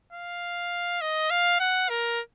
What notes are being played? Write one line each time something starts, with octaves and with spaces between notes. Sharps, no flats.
F5
D#5
F5
F#5
A#4